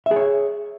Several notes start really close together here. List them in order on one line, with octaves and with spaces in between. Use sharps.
E5 G#4 C#5